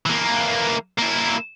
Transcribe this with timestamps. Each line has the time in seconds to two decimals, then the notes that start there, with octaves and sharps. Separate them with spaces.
0.06 E3 A#3
0.98 A#3 E4